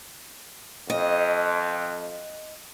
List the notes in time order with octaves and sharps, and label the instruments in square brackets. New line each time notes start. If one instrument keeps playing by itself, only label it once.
[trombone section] F2 [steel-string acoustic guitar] D#5